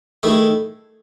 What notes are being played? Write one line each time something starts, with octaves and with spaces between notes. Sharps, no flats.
D#3 A3 E4 G#4